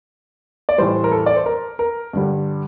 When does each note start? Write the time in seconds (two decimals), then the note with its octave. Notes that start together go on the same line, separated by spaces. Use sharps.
0.69 D5
0.78 A2 E3 G3 C5
1.04 A#4
1.12 A4
1.26 D5
1.36 C5
1.46 A#4
1.79 A#4
2.13 G2 D3 G3